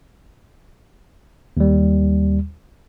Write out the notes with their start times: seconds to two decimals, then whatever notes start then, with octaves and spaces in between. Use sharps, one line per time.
1.57 D#2 G3